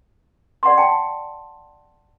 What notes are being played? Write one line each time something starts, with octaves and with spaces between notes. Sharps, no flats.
D5 F#5 A#5 C6
G5 A5